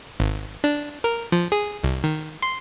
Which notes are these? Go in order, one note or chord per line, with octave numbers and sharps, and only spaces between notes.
G#1
D4
A#4
F3
G#4
C2
D#3
C6